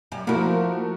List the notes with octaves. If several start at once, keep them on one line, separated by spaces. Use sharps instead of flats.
F#2 G3
F3 A3 A#3 E4 F#4 A#4